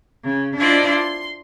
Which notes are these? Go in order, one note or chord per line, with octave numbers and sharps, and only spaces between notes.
C#3
D4 E4 F4 C5 D5 D#5
C6